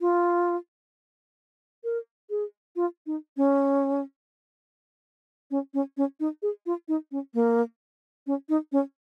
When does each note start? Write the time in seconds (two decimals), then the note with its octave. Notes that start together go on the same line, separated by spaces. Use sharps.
0.01 F4
1.84 A#4
2.30 G#4
2.76 F4
3.07 D#4
3.37 C#4
5.51 C#4
5.74 C#4
5.97 C#4
6.20 D#4
6.42 G#4
6.66 F4
6.88 D#4
7.12 C#4
7.34 A#3
8.27 C#4
8.49 D#4
8.72 C#4